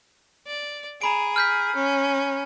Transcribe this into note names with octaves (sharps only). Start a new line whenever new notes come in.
D5
G#4 A#5 B5 D7
F6 G6 B6
C#4